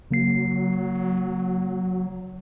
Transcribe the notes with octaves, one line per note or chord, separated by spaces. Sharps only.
C#3 F#3 A#3 C7